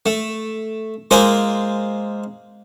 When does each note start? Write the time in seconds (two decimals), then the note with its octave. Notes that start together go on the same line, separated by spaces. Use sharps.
0.06 A3
1.11 G#3 A#3 F4 A#4 C5 G#5